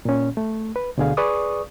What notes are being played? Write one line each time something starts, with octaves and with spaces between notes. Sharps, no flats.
A#2 C#4
A3
B4
D2 B2 D3 G#4 F5
G#4 B4 D5 C#6 D#6